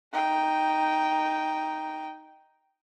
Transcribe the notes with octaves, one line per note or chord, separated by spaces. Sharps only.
D#4 G5